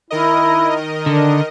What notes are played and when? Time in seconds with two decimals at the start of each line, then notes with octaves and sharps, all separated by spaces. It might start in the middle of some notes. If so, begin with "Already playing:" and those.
0.10 D#3 E4 A#4 D#5
1.06 D3 D4